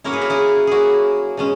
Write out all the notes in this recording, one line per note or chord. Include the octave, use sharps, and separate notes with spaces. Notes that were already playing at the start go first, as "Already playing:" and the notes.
F#3 A#3 C#4 E4 A#4 C#5
G#4 B4
F#4 A#4
E4 G#4
F#3 A#3 E4 F#4 G#4
B2 G#3 C#4